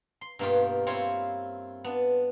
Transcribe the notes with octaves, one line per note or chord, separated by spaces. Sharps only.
C6
G2 B2 A#3 D#4 F4 G4
C4 E4 F4 C#5
B3 D4